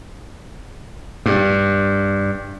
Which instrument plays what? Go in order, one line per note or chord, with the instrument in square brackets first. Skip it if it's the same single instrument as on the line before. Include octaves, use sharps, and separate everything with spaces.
[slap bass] G2